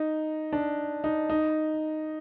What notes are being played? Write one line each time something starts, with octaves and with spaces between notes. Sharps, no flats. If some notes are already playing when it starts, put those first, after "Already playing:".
Already playing: D#4
D4
D#4
D#4